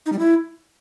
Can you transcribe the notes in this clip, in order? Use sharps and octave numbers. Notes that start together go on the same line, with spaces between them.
D#4
G3
E4